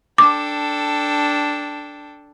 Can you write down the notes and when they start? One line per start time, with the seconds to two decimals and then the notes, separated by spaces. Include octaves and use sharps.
0.18 D4 A4 G5 D6